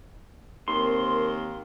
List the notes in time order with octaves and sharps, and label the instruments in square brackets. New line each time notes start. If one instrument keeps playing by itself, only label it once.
[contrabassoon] D#2 [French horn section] C4 A#4 [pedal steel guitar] C6